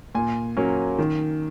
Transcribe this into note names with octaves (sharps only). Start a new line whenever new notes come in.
A#2 G#5
F#3 A#3 C#4
D#3